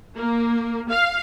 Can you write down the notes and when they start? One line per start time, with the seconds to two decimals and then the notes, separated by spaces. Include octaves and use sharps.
0.17 A#3
0.89 F5